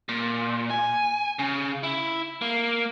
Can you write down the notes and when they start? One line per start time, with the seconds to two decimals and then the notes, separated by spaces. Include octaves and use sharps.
0.09 A#2
0.70 G#5
1.39 C#3
1.83 E4
2.42 A#3